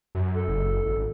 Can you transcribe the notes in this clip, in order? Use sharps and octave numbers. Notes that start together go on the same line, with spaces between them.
F#2
A4
F#1
G#1